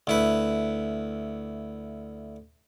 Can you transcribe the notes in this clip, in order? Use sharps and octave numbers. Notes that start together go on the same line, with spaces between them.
D2 E4 B4